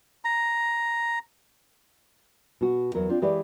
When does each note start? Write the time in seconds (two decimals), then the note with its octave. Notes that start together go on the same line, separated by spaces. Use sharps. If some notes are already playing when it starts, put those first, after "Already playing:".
0.25 A#5
2.61 B2 F#4
2.95 E2 F#3 A#4
3.09 C4 D4 F4
3.22 E3 G#3 G4 B4 C#5 D5